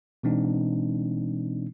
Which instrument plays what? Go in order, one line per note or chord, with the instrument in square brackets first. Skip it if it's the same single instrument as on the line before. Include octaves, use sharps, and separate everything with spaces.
[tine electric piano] B2 E3 G#3 C4 D4 D#4